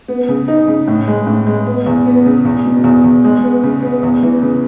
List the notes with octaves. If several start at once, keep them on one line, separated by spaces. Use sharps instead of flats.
B3
C#3
D#4
C#3
A2
G#3
A2
G#3
B3
E2
B3
C#3
E2
B2
E2
E2
G#3
B3
C#3
B3
E2
E3
C#3